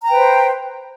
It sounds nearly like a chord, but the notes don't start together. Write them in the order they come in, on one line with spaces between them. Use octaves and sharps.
A#5 G5 B4 C5